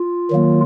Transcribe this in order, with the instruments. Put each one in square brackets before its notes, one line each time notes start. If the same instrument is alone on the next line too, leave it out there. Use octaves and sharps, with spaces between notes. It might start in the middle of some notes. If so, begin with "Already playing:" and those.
Already playing: [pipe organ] F4
D#3 F#3 A#3